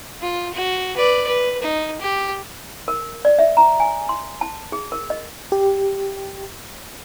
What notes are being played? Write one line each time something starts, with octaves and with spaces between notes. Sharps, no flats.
F4
F#4
B4 D5
B4
D#4
G4
A#4
D5
E5
A#5
G#5
C6
A5
G#4
A#4
D#5
G4